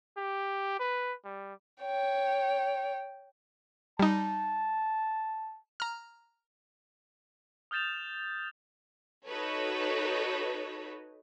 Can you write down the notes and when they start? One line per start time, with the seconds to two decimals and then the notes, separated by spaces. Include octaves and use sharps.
0.17 G4
0.80 B4
1.25 G3
1.83 C#5 G5
3.99 G3 D#4 A5
5.80 A#5 F6
7.71 D#6 F6 G6 A6 E7 F7
9.28 D#4 F#4 A4 B4 C#5